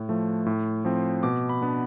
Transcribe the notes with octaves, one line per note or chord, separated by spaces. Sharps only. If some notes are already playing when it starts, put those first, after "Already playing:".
Already playing: A2
F3 A3
A2
F3 C4
B2 D6
B5
B3 D4